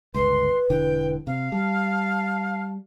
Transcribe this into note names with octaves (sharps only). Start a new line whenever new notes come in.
G1 C#2 B4 C6
E1 D3 E3 G5
C3 F5
G3 A5